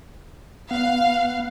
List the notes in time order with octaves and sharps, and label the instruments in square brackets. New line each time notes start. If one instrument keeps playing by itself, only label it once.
[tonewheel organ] B3 F#5 [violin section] F5